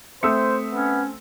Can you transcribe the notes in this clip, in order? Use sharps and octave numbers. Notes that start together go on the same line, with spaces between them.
A3 C4 C5 E5 D#6 E6 C#7
B3 C#4